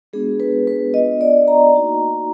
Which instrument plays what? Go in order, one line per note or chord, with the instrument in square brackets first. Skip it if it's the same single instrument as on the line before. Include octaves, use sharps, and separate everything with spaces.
[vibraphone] G#3 B3 D4 F#4 G#4
B4
B4
B3 D4 F4 D#5
D5
A#5
A#3 D#4 F#4